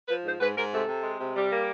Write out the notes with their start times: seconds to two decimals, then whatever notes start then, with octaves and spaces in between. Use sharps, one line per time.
0.08 F3 B4
0.24 G#2 C5
0.40 G#2 B4
0.56 G#2 A#4
0.71 C3 A4
0.87 C3
1.03 G#3
1.19 C3
1.35 G3
1.51 A#3